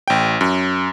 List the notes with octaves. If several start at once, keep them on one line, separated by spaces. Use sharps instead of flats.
A1 G5
F#2